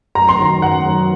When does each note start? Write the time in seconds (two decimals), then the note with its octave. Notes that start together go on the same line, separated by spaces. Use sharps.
0.15 F#2 A#5
0.29 C6
0.39 D#3 F#3 A#5
0.62 F#2 F#5
0.86 D#3 F#3